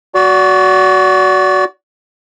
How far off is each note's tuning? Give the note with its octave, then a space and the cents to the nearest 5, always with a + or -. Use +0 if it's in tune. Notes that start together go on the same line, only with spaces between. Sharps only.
F#4 +5 D5 -30